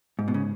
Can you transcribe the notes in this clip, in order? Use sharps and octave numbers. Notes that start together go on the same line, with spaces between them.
G#2
B2
C#3